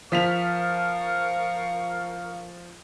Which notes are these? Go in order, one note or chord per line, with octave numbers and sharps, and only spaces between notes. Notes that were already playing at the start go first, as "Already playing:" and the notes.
F3 A#4 F5 C#6 B6 F7